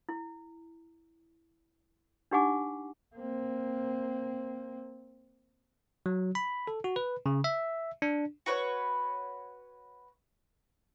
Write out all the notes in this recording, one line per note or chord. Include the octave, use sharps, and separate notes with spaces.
E4
D4 D#4 G4 F#5 G#5 D6
A#3 C4
F#3
B5
A4
F#4
B4
C#3
E5
D4
F#4 B4 C#5